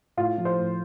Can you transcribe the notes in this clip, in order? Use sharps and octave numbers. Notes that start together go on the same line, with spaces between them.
A2 F4
F3
C5
A2